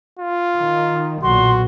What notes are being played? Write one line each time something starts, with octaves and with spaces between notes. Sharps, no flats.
F4
D#3
B1 A#2 F#4 C6